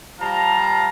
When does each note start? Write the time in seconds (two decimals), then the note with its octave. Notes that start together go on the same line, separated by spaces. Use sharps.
0.20 F3 G3 F5 A5 A#5